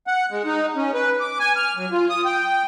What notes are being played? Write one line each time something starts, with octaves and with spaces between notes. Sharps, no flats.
F#5
G#3
D#4
C#4
B4
D6
G#5
F6
F#3
F4
D#6
G5